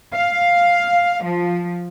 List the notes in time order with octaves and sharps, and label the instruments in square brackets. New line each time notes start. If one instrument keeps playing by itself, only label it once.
[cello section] F5
F3